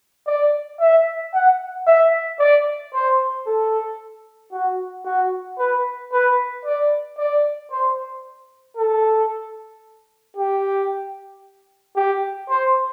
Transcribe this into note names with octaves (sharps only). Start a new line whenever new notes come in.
D5
E5
F#5
E5
D5
C5
A4
F#4
F#4
B4
B4
D5
D5
C5
A4
G4
G4
C5